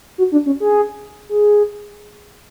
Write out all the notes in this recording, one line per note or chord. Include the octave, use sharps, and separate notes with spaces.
F#4
D4
C#4
G#4
G#4